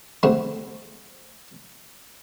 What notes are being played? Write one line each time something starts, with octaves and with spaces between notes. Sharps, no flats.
D3 G3 A3 C4